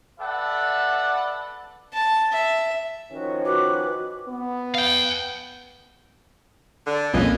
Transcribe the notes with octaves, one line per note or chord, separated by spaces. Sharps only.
A4 B4 D5 E5 F#5
A5
E5
D#3 F3 C#4 F#4
F#4 B4 D6
B3
F5 G5
D3
B1 F2 E3 A#3 C#4 F4 G#4 D#5